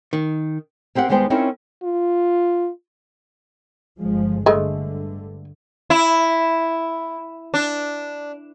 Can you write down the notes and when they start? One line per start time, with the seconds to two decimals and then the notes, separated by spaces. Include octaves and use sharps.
0.13 D#3
0.95 A#3 C4 G4 F5 F#5
1.09 D#2 G3 G#3 B3 C5 G5
1.30 C4 C#4 D#4 E4 A#4 C#5
1.84 F4
4.01 G1 F3 G#3
4.46 G2 D3 G#3 A3
5.90 E4
7.54 D4